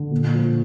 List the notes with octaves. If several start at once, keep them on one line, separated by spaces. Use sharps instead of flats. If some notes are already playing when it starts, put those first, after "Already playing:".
Already playing: D3
A#2
F3